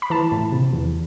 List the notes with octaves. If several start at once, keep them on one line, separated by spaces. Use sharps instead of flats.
B5
E3 A5
A2
C3
E2